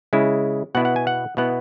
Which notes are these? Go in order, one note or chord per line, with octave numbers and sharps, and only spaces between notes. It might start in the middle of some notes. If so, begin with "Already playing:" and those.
C#3 G#3 E4
B2 B3 E4 F#5
F#5
G#5
F#5
B2 B3 E4 F#5